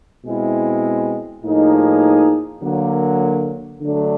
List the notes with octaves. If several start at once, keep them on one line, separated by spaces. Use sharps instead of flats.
B2 G#3 C4 E4
A2 F3 A#3 D#4 G#4
D3 F#3 A#3
D3 F#3 A3 D4